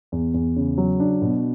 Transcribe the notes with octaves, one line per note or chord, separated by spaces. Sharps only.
E2
E2
C#3
F#3
D4
B2